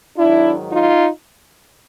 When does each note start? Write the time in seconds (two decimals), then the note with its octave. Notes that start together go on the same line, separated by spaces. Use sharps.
0.17 G#2 D#3 F#3 D4 E4
0.71 D#4 F4